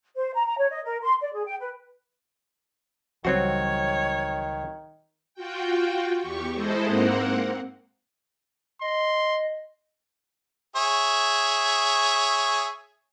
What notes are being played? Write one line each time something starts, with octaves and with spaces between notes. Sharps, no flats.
C5
A#5
A#5
C#5
D#5
A#4
C6
D5
G#4
G5
B4
C#2 D#3 E3 F#3 G3 C4 F#4 C#5
F4 F#4 G5
E2 G4 C#6
G#3 E4 A4 C5 D#5
G#2 A#3 C4 A#4 F#5
D#5 C6
G#4 C#5 E5